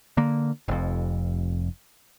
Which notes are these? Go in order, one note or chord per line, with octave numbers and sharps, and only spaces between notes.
D3 A#3
F1 F2